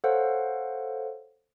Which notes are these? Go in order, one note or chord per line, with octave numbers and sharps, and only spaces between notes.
A4 C5 C#5 F5 F#5